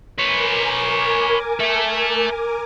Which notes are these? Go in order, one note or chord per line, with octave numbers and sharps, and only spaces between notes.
A#4 B4 C#5 G#5 D6
A4 E5